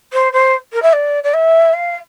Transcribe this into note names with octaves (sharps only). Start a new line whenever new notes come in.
C5
C5
A#4
E5
D5
D5
E5
F5